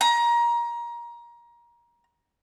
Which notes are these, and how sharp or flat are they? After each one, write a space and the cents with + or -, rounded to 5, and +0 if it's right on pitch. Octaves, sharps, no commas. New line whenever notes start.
A#5 +25